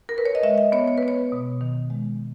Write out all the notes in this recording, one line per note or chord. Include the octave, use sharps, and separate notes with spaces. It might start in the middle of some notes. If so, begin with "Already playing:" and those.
A#4
B4
C#5
D#5
G#3 E5
D#5
B3 C#5
C#5
B4
B3
C#5
B2
D#3
G#3